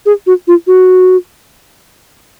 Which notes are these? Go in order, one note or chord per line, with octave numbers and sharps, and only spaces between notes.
G#4
F#4
F4
F#4